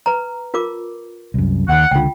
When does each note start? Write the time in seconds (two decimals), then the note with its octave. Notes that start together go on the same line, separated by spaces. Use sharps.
0.06 B4 A#5
0.54 F4 A#4 D6
1.34 C2 F#2
1.68 D#2 D#3 F#5
1.91 C#2 D3 F4 G5